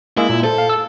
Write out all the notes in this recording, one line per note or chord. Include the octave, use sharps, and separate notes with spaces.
G#3 A#3 E4 G#4
A#2
A4 C5
F5
E6